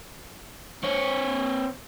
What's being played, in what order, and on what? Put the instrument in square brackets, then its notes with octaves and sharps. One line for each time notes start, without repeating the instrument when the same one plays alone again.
[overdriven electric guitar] C4 C#5